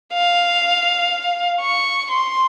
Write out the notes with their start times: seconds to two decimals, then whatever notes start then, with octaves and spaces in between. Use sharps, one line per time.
0.13 F5
1.61 C#6
2.11 C6